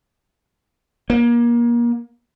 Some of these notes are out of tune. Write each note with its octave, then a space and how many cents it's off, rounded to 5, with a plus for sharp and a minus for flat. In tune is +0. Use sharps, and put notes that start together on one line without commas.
A#3 +30